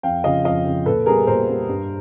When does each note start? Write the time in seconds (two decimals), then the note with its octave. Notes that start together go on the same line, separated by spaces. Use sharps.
0.03 F2 F5 G5
0.24 C#3 F3 D#5 F5
0.45 F2 D#5 F5
0.66 C#3 F3
0.86 A#2 A4 B4
1.06 G3 B3 G#4 A#4
1.27 A#2 A#4 C5
1.48 G3 B3
1.69 G2